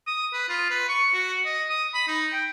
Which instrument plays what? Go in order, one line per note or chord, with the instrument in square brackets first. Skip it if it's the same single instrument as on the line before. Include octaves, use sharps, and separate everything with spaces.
[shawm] D#6
B4
F4
B4
C#6
F#4
D#5
D#6
B5
D#4
G5